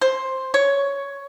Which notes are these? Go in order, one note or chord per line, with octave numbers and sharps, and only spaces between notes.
C5
C#5